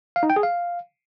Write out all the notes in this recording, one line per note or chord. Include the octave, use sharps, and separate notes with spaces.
F5
D#4
G5
G#4
F5